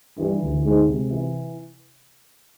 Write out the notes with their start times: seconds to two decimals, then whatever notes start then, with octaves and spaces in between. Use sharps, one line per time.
0.18 G2 E3
0.41 D2
0.64 G#2 G#3
0.87 C3
1.10 E3